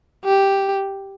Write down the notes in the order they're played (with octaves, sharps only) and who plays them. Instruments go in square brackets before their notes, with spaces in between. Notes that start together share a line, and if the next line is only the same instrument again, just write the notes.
[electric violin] G4